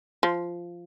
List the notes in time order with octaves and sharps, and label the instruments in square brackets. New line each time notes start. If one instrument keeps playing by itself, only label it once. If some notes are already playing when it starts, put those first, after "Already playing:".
[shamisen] F3